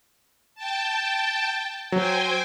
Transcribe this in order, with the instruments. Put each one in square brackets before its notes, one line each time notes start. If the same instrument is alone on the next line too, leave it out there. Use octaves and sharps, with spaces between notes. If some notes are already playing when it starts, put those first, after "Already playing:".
[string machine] G5 A5
[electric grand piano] F#3 [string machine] C5 G5 G#5